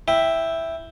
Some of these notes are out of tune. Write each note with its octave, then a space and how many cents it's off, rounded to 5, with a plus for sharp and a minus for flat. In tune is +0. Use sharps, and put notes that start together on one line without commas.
E4 +0 E5 +0 G5 +5